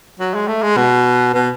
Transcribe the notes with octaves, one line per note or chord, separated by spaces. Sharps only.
F#3
G#3
A3
G#3
B2
B2